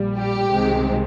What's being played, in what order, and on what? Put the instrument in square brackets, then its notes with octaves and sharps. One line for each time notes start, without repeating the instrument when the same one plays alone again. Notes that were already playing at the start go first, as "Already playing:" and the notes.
Already playing: [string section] A#1 A#2 G3
G4
C2 C3 D#3 G#3 C4